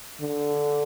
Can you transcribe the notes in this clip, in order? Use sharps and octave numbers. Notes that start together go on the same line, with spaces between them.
D3